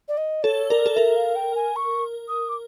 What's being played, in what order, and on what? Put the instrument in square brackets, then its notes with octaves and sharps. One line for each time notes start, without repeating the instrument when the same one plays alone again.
[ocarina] D5
D#5
[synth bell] A4 [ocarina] C#5
[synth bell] A#4 [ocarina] D5
[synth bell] A4
[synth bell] A#4 [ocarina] E5
[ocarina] F5
G5
G#5
C#6
D#6
D6